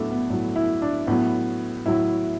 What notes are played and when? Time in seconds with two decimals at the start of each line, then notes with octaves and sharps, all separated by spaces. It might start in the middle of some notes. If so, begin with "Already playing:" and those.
Already playing: A2 F#3 A3 B3 D4
0.11 B3
0.30 A2 F#3
0.56 E4
0.82 D4
1.07 A2 F#3 B3
1.86 A2 F#3 E4